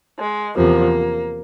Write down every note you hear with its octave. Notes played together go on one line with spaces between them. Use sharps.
G#3
E2 C3 F3 A#3